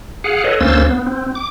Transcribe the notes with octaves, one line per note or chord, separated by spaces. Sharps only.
G#4 F5 F#5
A4 B4 C#5 D#5
D2 A#3 C#4 C5 E6 A6
B3
C4
D6